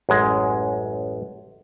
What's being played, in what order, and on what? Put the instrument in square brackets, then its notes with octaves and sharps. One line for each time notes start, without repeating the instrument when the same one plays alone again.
[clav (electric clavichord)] A1 F#2 G#3